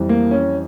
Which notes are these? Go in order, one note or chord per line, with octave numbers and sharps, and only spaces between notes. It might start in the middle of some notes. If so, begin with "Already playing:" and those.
Already playing: F2 E3 G3
A#3
C#4